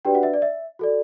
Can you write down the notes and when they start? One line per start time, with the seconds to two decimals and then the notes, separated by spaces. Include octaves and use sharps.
0.05 D4 F#4 G4 B4 D5 G5
0.15 F#4 F#5
0.23 E5
0.34 D5
0.42 E5
0.79 F#4 A4 D5